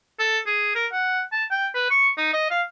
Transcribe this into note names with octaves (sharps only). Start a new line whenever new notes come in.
A4
G#4
A#4
F#5
A5
G5
B4
C#6
D#4
D#5
F5